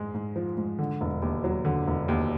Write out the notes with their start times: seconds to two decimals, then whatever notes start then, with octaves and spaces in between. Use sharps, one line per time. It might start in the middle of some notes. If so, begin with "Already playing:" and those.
Already playing: G#2 G#3
0.14 G#2
0.36 F3
0.57 G#2
0.79 D3
1.01 E1
1.22 D#2
1.44 F#3
1.65 D3
1.87 E1
2.08 D#2